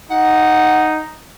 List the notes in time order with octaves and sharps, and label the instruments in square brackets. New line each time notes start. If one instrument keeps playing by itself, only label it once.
[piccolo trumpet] D#4 [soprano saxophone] F#5